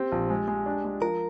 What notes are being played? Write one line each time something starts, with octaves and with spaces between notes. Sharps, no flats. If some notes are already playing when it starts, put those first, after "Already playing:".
Already playing: C4 G4
A#1
G#3
G#3
D4
G#3
F3 A#4